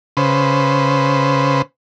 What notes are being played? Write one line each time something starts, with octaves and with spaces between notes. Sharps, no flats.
C#3 B4 C5